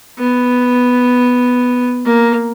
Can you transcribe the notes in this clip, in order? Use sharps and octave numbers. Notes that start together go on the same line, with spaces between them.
B3
A#3